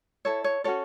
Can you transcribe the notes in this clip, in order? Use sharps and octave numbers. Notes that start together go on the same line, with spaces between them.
E4 A4 C#5
C#5
C#4 F#4 A4 C#5